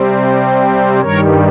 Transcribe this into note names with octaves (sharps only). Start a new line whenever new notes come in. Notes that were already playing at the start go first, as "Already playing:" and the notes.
Already playing: C3 G3 C4
G2 D#3 G3 A#4 C#5